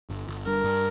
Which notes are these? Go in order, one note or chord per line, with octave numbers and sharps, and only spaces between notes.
G1
G1
G2 A#4
G2